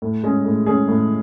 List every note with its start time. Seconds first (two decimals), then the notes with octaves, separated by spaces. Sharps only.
0.02 A2
0.24 G#3 C#4 G#4
0.45 A2
0.66 G#3 C#4 G#4
0.88 A2